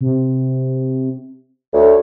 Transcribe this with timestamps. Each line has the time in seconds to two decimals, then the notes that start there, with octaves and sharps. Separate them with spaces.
0.01 C3
1.73 D2 C#5